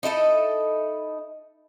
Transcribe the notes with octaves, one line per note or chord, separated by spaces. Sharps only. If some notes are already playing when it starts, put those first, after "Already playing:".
D#4 E4 A4 D#5